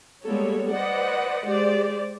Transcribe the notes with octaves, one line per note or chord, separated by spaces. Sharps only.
G3 G#3 A#3 B3 A4 C#5
B4 C5 D5 D#5 F#5
G#3 G4 C5 D5